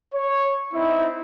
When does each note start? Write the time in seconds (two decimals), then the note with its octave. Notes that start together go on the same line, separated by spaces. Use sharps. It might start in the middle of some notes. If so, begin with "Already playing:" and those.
0.14 C#5
0.74 C4 D#4 E4